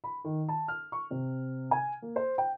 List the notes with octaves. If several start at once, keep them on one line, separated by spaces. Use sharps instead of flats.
B5
D#3
A5
F6
C#6
C3
G#5
A#3
C5
G5